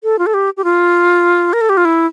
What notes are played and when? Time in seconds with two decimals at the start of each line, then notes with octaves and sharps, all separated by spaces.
0.04 A4
0.19 F4
0.26 A4
0.34 G4
0.57 G4
0.64 F4
1.53 A#4
1.61 A4
1.69 G4
1.77 F4
1.85 E4